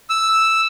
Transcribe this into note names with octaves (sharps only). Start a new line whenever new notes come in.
E6